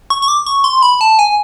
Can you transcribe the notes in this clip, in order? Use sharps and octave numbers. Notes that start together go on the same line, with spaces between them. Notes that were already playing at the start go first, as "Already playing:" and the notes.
C#6
C#6
D6
C#6
C6
B5
A5
G#5